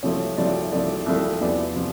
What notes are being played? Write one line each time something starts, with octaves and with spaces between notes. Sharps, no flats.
C2 C3 F3 A3 C#5
C2 C3 F3 A3 D5
C2 C3 F3 A3 D5
C2 C3 F3 A3
E2 C3 F3 D5
C3 F3